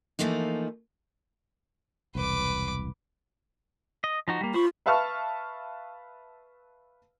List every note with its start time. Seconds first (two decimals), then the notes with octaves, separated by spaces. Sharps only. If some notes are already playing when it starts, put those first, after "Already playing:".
0.19 E3 F3 A3 A#3 D#4
2.15 E1 C2 B4 D6
4.04 D#5
4.28 F3 D#4 F#4
4.41 G3 A#3
4.54 F4 C5 B5 C#6
4.86 B4 E5 F5 A5 C#6 F6